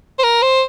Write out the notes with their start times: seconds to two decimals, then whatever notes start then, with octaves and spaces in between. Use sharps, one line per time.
0.19 C5
0.24 A#4
0.43 C5